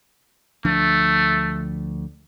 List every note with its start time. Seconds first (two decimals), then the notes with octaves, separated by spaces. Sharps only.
0.65 D2 F3 A3 D4